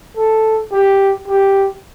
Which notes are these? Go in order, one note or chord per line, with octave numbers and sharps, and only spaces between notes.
A4
G4
G4